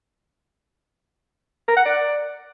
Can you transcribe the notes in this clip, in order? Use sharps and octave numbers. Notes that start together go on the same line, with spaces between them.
A#4
F#5
D5